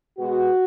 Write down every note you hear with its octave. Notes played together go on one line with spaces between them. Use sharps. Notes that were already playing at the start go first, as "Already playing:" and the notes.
B2 G#3 B3 F#4